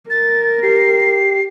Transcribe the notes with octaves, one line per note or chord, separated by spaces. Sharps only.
A#4 A6
G4 C7